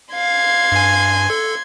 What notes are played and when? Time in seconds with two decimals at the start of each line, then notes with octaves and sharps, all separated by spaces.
0.15 F5 C6 G#6
0.72 G2 G#5
1.30 A4